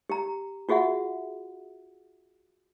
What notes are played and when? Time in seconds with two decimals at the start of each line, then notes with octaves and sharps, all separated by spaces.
0.10 G4 A#5
0.69 F4 F#4 G#4 E5 F#5